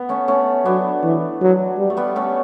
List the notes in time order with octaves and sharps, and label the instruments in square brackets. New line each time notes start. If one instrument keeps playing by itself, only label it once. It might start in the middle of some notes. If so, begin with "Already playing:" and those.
Already playing: [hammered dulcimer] B3
A3 C#4
A3 C#4
[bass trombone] F#3 [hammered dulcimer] B3 D4
[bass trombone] E3
F#3
G3
[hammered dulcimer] A3
G3 B3
A3 C#4